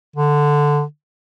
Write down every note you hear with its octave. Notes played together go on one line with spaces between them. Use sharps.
D3